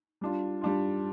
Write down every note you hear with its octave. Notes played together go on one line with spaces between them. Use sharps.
G3 D4 F4
G3 D4 F4